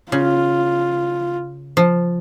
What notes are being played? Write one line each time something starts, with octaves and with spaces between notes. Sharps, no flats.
C#3 F4
F3